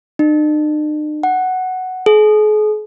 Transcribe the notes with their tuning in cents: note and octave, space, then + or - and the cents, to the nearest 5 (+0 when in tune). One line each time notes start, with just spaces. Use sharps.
D#4 -45
F#5 +5
G#4 +40